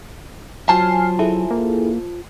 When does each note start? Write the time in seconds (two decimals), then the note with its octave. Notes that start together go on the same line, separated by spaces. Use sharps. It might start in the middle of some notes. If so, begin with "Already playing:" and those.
0.69 F#3 F4 C5 G#5 A5 F6 C7
1.19 E4 G#4 A4
1.51 A#3